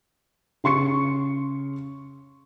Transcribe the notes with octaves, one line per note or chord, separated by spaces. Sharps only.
C#3 C6 C#6 C#7